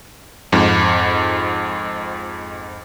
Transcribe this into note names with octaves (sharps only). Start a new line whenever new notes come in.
F2 G#2